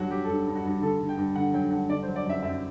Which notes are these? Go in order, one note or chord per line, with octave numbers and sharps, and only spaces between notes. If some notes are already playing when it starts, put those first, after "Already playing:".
Already playing: G2 F#3 F#4
F#3 G4
A4
G2 G4
G2
F#4
G2
D3 A4
D3
G5
G2
D3 F#5
F#3 G5
G2 F#5
D3 D5
C5
F#3
D5
F#2 E5
F#2 E5